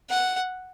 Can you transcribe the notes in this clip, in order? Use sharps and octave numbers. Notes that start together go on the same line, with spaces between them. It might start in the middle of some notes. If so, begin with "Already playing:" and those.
F#5